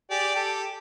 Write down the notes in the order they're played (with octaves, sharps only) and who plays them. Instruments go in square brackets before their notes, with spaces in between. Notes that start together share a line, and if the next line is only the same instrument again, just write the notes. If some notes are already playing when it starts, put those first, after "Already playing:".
[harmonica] G4 G#4 D5
G4 A4